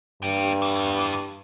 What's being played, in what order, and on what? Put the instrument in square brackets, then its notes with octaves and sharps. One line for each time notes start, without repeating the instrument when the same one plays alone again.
[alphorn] G2 [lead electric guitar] A#3 G5
[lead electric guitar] E2 E3